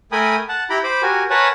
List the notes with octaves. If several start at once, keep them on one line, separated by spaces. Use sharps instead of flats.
A3 A#4 G5 G#5 B5 D#6
F#5 A5
E4 G4 G5 A#5 B5
C5 B5 D6
F#4 G4 A#4 G#5
A#4 B4 C#5 F#5 G#5 A5